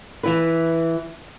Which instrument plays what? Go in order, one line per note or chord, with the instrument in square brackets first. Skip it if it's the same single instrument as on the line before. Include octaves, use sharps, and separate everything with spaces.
[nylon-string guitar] E3 E4 B4